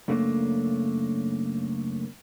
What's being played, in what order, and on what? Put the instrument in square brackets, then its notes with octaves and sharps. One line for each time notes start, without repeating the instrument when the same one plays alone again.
[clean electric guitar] F#2 C#3 A3 A#3 D4